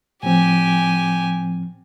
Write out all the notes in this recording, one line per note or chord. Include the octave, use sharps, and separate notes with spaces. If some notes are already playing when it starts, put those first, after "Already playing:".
A2 F3 C4 G4 G#5